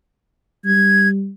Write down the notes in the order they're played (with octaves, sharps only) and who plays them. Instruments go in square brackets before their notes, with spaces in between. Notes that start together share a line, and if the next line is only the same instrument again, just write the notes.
[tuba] G3 [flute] G#6